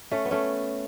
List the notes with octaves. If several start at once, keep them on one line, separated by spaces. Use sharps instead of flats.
A3 C#4
B3
A3 C#4